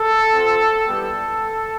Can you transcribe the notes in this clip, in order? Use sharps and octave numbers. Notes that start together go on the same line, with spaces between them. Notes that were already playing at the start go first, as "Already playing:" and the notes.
Already playing: A4
C4 F4
G3 B3 E4 G4 A4